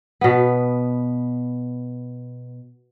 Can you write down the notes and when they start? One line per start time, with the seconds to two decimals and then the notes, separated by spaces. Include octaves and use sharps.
0.21 B2 B3